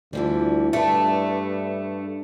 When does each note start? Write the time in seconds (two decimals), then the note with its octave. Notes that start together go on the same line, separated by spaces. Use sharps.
0.13 D2 E3 F3 G3
0.73 G2 A3 D4 B4